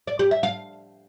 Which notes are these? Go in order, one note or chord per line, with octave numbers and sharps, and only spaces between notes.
D5
G4
E5
F5